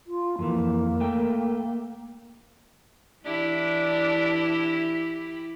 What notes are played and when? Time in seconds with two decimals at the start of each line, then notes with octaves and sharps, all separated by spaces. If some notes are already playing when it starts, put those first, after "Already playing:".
0.07 F4
0.39 F2 E3 A#3
1.00 A3 G5
3.25 E3 D4 E4 G4